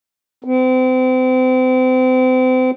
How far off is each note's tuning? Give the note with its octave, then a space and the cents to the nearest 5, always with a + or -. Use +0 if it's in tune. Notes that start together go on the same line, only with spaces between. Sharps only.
C4 -35